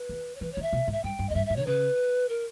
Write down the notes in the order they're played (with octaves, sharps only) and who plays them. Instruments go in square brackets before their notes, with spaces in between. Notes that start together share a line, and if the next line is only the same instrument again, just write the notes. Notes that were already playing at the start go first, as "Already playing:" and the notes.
Already playing: [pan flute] B4
[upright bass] E2
[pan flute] C#5
[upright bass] E3 [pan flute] B4
[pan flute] C#5
[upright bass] D#3
[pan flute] E5
[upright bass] B2
G#2
[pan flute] E5
[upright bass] G2 [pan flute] G5
[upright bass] G2
[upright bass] E2 [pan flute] D#5
[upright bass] G2 [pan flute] E5
[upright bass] G#2 [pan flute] E5
[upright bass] D#3 [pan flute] C#5
[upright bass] C#3 [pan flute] B4
[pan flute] A#4